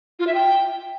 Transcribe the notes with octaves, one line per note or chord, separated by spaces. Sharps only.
F4
E5
G5